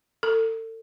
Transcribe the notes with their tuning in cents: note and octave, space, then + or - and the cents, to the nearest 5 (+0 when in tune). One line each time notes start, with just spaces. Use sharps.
A4 +35